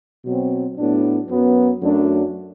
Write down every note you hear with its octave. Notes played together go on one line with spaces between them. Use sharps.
B2 F#3 C4
A2 F#3 B3 D4
F#2 F#3 B3
F#2 F#3 A3 D4